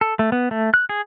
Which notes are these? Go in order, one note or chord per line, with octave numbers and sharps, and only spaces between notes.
A4
A3
B3
A3
F#6
G#4